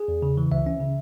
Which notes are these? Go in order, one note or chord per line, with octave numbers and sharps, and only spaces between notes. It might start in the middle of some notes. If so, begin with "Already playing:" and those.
Already playing: G#4
E2
C#3
E3
C#2 E5
C#4
C#3